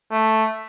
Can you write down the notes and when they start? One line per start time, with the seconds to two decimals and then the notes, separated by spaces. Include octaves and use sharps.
0.11 A3